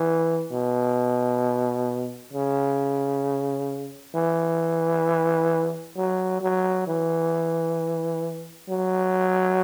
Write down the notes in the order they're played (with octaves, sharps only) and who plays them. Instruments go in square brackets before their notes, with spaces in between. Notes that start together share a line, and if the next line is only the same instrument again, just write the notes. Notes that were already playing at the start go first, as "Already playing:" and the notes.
Already playing: [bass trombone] E3
B2
C#3
E3
F#3
F#3
E3
F#3